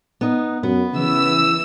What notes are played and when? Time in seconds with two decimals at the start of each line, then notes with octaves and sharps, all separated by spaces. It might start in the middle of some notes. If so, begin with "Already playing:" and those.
0.21 B3 D#4
0.63 F#2 B3
0.94 C#3 E3 E6